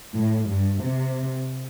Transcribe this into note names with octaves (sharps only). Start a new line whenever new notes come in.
A2
G2
C3